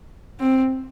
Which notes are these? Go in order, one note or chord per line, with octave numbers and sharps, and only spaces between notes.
C4